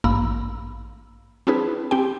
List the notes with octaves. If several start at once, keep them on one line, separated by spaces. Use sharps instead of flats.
A1 G2 A#3 A#5 B5 E6
C4 D4 E4 G#4 B4
C4 G4 G5